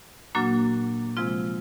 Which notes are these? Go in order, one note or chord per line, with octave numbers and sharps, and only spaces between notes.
A#2 F#3 A#3 D4 F#4
C3 F3 G#3 C4 F4